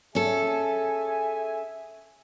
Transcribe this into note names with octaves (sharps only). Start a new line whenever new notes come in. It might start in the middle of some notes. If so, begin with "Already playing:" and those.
C#4 G#4 A4 E5 G#5